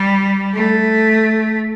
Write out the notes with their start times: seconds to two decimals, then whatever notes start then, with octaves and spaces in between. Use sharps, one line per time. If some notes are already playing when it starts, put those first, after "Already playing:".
Already playing: G3
0.54 A3